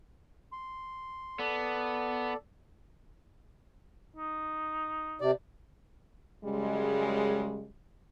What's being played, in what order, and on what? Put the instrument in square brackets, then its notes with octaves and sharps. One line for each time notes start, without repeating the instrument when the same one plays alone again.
[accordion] C6
[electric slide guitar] B3 [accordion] A4 D5
[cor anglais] D#4
[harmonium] C3 D5
[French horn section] F#2 C#3 G3 G#3